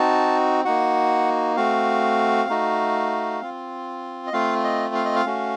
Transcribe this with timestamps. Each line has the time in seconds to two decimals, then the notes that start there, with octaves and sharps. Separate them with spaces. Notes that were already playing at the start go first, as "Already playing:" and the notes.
Already playing: C4 D#4 F#4 A5
0.65 A#3 D#4 F#4 F#5
1.56 A3 C4 F#4 F5
2.49 A3 D#4 F#4
3.41 C4 F4
4.27 D#5
4.33 A3 C4 F4 F5
4.64 D#5
4.95 F5
5.05 D#5
5.16 F5
5.26 A3 C#4 F#4